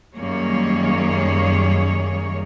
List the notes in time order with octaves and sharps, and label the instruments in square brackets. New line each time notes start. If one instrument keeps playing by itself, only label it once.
[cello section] F#2 D#3 G3 A#3 G#4 C#5